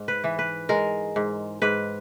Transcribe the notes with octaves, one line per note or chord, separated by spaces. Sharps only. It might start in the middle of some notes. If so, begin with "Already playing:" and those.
Already playing: G#2
B4
E3
B4
G#3 A#4
G#2
G#2 B4